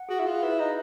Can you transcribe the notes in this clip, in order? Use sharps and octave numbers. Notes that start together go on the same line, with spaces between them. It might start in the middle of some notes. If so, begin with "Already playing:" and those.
Already playing: F#5
F#4 G#4
E4
F4 G#4
E4 B4
D#4 D#5